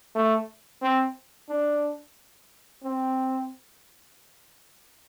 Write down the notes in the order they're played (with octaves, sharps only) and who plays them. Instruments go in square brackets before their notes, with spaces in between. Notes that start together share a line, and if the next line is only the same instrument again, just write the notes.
[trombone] A3
C4
D4
C4